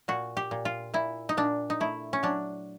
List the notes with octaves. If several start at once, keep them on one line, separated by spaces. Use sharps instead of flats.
A#2 F#4
G4
A#2
F4
A#2 E4
D#4
A#2 D4
D#4
A3 E4
C#4
F#3 D4